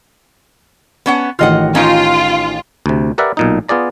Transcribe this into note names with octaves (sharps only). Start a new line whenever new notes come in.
B3 C#4 F#5
A1 D#3 F4 D#5 F#5 F6
C#4 D#4 F4 G5
D2 C3
G4 A#4 B4 D5 E5 F#5
B1 A#2 D#4
B3 F4 G#4 D5 A#5